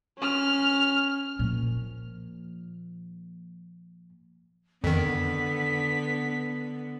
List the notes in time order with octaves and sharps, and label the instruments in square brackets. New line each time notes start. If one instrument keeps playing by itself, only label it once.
[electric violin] C#4 F6
[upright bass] A#2 F3
[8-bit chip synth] F2 D#3 [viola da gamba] D3 B3 [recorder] B6